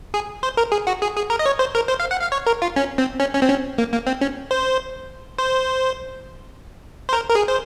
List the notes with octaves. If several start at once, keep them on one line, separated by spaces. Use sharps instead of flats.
G#4
C5
A#4
G#4
F#4
G#4
G#4
A#4
D#5
C#5
C5
A#4
C5
F5
F#5
F5
C#5
A#4
F4
C#4
C4
C#4
C#4
C4
C#4
A#3
A#3
C4
C#4
C5
C5
C5
A#4
A#4
G#4
C5